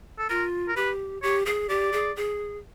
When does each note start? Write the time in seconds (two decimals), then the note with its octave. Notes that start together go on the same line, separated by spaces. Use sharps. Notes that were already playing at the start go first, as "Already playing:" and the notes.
0.19 A4
0.30 F4 A#4
0.69 A#4
0.76 G4 B4
1.23 G4 C#5
1.46 G#4
1.69 G4 D5
1.93 G#4
2.16 G#4